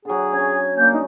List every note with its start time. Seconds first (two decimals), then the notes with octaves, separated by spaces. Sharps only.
0.05 D3 F#3 G#4
0.33 C#4 G#6
0.77 A#3 C#4 D4 G6
0.93 A3 D#4